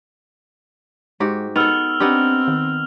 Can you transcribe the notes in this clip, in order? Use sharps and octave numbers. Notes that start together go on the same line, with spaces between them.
G#2 G#3 F#4 G4
B3 D#4 A4 E6 F6 F7
B3 C4 D4 D#4 G4
D#3